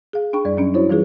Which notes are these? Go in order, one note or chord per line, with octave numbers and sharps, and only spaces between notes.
G#4 F5
D4 G#4 G5 B5 C#6
F#2 G3 D5
F#3 C#4 D4
D4 E4 F#4 C5 C#5
E3 G3 F4 G#4 B4